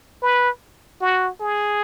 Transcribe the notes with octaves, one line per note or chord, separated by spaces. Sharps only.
B4
F#4
G#4